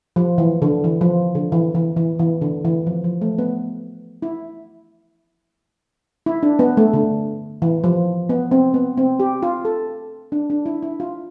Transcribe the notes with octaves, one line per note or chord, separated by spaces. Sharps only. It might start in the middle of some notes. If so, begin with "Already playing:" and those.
F3
E3
D3
E3
F3
D3
E3
E3
E3
E3
D3
E3
F3
F3
A3
B3
E4
E4
D4
B3
A3
D3
E3
F3
B3
C4
B3
C4
G4
F4
A4
D4
D4
E4
E4
F4